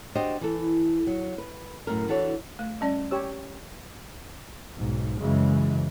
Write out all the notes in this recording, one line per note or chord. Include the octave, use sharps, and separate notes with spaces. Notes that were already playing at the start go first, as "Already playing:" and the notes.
D4 F#4 G4 C5 D#5
E3 A4
F#3
B4
F#2 A2 A#4
E3 D4 F#4 A4 C#5
A3
G3 C#4 D5
G4 C#5 E6
B1 G#2
F#2 C#3 E3 G#3